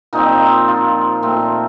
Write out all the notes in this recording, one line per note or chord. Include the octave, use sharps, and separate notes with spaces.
A#2 F3 C4 D#4
F4
A#2 A3 C4